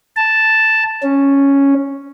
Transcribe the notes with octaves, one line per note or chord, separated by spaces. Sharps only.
A5
C#4